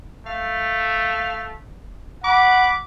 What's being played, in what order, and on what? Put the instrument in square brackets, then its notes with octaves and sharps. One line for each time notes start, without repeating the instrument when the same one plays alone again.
[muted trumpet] A3 [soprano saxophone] F5
[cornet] F#5 [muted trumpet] B5 [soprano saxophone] D6